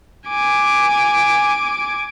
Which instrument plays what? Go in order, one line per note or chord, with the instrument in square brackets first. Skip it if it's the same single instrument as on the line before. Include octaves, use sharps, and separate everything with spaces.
[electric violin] G#5 D6